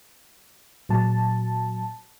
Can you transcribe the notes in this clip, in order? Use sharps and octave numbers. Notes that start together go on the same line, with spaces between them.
A#2 F#3 A5